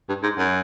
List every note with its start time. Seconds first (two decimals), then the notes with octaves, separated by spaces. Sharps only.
0.09 G2
0.23 G#2
0.38 F#2